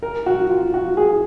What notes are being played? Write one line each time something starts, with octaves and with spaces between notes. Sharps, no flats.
A#4
F#4
F4
F#4
G#4